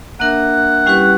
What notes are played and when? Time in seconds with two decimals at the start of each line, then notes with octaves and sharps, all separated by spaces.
0.20 A#3 D4 A#4 E5 F#5
0.86 G3 C#4 E4 G4 B4